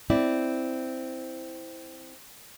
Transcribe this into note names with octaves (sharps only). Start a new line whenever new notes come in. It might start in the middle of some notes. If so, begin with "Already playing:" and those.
C4 E4 D5